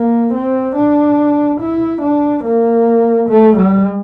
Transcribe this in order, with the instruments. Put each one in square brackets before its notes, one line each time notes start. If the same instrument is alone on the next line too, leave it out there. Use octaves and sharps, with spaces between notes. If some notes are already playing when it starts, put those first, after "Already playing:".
Already playing: [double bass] A#3
C4
D4
E4
D4
A#3
A3
G3